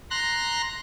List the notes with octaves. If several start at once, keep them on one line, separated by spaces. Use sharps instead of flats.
A#5 C6 F#6 A#6